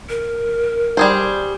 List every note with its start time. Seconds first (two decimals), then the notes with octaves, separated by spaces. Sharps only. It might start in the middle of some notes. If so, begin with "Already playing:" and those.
0.09 A#4
0.97 G3 G#4 C5